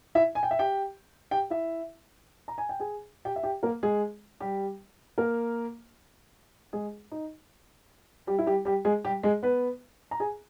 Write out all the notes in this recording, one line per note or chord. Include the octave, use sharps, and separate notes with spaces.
E4 E5
G#5
G5
E5
G4 G5
G4 G5
E4 E5
A#5
G#5
G5
G#4 G#5
G4 G5
E5
G4 G5
A#3 A#4
G#3 G#4
G3 G4
A#3 A#4
G#3 G#4
D#4
G3 G4
E4
G3 G4
G3 G4
G#3 G#4
G3 G4
G#3 G#4
B3 B4
A#5
G#4 G#5